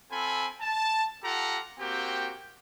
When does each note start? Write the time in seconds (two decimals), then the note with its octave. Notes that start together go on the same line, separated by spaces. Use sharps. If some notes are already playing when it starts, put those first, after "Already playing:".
0.10 C4 F4 A4 G#5 B5
0.60 A5
1.23 F4 G4 A4 F#5 A#5
1.79 A#3 C4 F#4 G4 G5